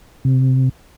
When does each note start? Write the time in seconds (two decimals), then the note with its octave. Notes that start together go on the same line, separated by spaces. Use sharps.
0.25 C3